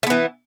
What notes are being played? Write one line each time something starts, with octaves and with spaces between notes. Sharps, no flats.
E3 A3 B3